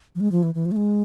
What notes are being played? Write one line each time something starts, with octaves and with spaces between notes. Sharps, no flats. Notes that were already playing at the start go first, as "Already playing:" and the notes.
F3
G#3
F3
E3
E3
F3
A3
G#3